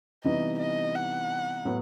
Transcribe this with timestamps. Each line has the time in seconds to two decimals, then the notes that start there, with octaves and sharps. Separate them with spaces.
0.24 C3 E3 G3 B3 D#4 D#5
0.59 D#5
0.95 F#5
1.65 A2 F#3 B3